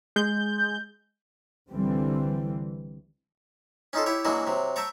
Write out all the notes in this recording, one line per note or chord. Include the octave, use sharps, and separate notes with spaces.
G#3 G6
C2 D3 E3 G3 C4
C#4 D#4 F4 A4
E4 G4 C#5
E3 F#3 G#3 A#3 D4 F#4
C3 F#3
E5 G5 A5 A#5 C#6